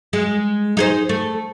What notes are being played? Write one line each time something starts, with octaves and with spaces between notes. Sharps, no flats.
G#3
D#4 G#4 C5
A3